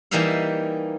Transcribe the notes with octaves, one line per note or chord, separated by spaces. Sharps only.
E3 G3 A#3 D#4 E5 F5